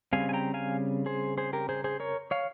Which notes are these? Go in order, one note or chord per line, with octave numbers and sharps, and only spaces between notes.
C#3 G3 C4 F5 G#5
G#5
G5 A#5
F5 G#5
G#4 C5
G#4 C5
G4 A#4
G#4 C5
G#4 C5
A#4 C#5
C#5 F5